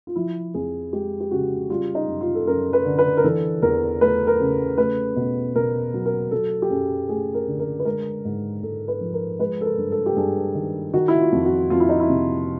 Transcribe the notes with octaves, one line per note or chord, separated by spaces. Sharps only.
F4
F3 E4
F2 G#4
G#3 G4
G4
C#3 F#4
G3 F4
D#4
F#2
F4
A4
F#2 A#4
B4
D3
B4
A#4
E3 A4
E2 A#4
A3 B4
A#4
C#3
A3 B4
B2
B2 A#4
F#3
A#4
F#3 A4
G4
F#2 G#4
A3 G#4
A#4
D3
A#4
B4
G#3 A#4
G#2
G#2 A4
B4
F3
A#4
G#3 B4
A4
A#4
G2
A4
G4
G2 G#4
D#3
D#3 F#4
E4
F4
F2
F#4
F2 F4
E4
D#4
E4
C3